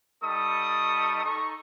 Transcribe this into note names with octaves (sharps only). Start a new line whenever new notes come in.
G3 D#4 A4 C#6 D#6
D#4 A4 C#6